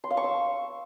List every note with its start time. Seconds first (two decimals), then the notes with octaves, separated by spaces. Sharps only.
0.04 C6
0.10 F5
0.17 C#6
0.24 E6